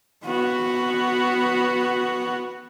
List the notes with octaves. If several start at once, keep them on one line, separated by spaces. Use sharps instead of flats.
B3 F#4